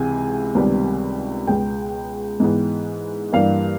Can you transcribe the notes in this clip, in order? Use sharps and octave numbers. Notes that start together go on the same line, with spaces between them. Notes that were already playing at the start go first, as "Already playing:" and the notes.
Already playing: C#2 C3 E3 G#3 G#5
C#2 C3 D#3 G3 B3
C#2 B2 G#3 B3 G5
G#2 E3 G#3 B3
G2 E3 G3 A#3 F5